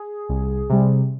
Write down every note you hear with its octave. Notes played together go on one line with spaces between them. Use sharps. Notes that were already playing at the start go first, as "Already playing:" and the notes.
Already playing: G#4
C2
C3 G3